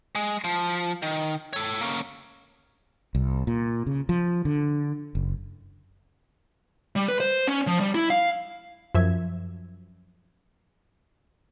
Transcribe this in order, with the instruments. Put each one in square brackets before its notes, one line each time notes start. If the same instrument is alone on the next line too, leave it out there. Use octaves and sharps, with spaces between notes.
[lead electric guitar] G#3
F3
D#3
A4 C#5
A#3 C#4
[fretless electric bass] C2
A#2
C#3
F3
D3
F#1
[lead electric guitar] G3
B4
C5
C#4
F3
G3
E4
F5
[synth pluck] F#2 F3 E5 G#6